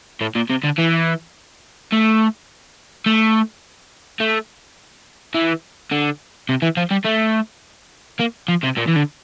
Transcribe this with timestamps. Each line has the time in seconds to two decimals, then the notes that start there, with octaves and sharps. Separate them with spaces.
0.21 A2
0.36 A#2
0.50 C3
0.64 D3
0.78 E3
1.93 A3
3.06 A3
4.20 A3
5.35 E3
5.91 D3
6.49 C3
6.62 E3
6.77 F3
6.91 G3
7.05 A3
8.20 A#3
8.48 F3
8.63 C3
8.77 A#2
8.88 E3
8.96 D3